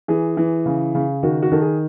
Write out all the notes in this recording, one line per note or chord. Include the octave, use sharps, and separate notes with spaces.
E3 G#4
E3
C#3
C#3
D#3 F#4
F#4
D#3 A4
G#4